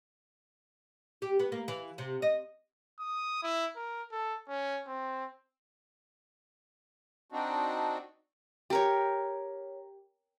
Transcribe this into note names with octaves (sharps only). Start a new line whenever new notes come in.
G4
B3
A#3
E3
C3
D#5
D#6
E4
A#4
A4
C#4
C4
C4 D4 D#4 F#4
G4 A#4 C#5